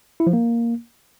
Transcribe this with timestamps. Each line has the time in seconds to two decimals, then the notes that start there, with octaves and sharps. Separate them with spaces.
0.20 E4
0.27 F3
0.33 A#3